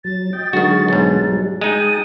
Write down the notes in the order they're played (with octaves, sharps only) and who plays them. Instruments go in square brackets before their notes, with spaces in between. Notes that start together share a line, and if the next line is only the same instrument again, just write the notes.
[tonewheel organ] F#3 [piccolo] A6
[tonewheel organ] D#5 G5
[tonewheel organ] D3 F#3 G#3 [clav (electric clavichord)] D#3 F#4
[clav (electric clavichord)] B1 G#2
[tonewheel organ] F#3 G3
[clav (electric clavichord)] G#3 D#4 [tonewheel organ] G5 A5 D#6 [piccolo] D#7